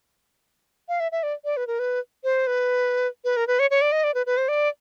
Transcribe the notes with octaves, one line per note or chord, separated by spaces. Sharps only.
F5
E5
E5
D5
D5
B4
A#4
B4
C5
B4
B4
A#4
B4
C#5
C#5
D5
D#5
D5
B4
B4
C5
D5